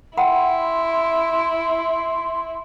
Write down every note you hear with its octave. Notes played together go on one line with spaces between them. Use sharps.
E4 F#5 G5 B5 C6